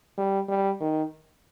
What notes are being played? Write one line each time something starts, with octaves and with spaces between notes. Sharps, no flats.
G3
G3
D#3